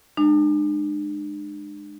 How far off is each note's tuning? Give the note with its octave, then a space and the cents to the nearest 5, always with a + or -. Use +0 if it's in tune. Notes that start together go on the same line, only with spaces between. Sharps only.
G#3 -5 D4 +40